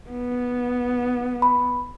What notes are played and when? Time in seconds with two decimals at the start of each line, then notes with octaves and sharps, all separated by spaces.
0.10 B3
1.42 B5